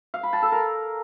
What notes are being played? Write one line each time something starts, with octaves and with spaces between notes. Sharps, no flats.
F5
B5
A5
A4
A#4